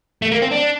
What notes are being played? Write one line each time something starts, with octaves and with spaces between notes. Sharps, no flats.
A3
A#3
C4
D4